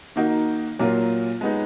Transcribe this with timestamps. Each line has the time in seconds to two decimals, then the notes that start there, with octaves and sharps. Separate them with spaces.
0.16 D#3 A#3 D#4 F#4
0.79 A#2 F#3 A#3 F4
1.41 G#3 B3 D#4